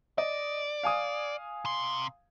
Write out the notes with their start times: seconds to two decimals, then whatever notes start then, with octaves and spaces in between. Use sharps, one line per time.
0.18 D5 D#5
0.83 F5 G#5 D#6
1.65 C3 C6